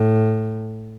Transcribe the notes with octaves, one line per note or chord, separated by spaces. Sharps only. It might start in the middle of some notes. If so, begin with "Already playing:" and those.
Already playing: A2